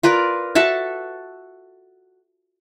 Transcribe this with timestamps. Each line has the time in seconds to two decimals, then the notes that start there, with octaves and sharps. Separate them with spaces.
0.03 F4 A#4 B4 D5
0.55 F#4 A4 E5 A5